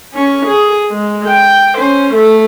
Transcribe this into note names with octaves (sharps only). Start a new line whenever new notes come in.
C#4 C#6
G#4
G#3
G5
C#4 C5
A3 A4